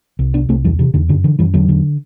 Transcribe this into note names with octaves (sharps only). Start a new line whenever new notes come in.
C2
C3 B3 D4
C2 A3 C4
E2 E3 G3
C3 E3
E2 D3
F#2 D3
D3 E3
F#2 E3 G3
E2 D3 F#3
D3